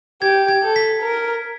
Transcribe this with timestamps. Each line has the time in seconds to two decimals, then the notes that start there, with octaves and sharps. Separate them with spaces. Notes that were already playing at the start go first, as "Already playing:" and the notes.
0.22 G4 G#6
0.48 G#6
0.63 A4
0.76 B6
1.02 A#4